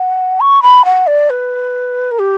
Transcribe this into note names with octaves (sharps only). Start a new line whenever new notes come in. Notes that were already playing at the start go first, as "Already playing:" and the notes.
Already playing: F#5
C#6
B5
F#5
D5
B4
A#4
G4